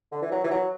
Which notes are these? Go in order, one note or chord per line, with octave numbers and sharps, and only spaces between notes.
D3
E3
F#3
E3
F#3